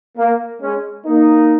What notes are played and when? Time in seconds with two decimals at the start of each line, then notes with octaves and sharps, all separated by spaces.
0.17 A#3
0.61 G#3 C#4
1.05 A#3 D#4